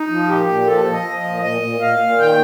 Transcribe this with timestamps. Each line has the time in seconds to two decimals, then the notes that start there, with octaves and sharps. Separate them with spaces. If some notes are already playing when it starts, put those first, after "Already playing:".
Already playing: D#4
0.09 F3
0.28 A#2 G4
0.47 A#2
0.66 F3 A4
0.85 F3
0.92 D#5
1.05 F3
1.17 D#5
1.24 A#2
1.42 A#2 D#5
1.62 A#2
1.81 A#2 F5
1.99 A#2
2.18 D#3 G5